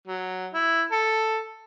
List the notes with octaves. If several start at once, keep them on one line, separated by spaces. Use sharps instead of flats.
F#3
E4
A4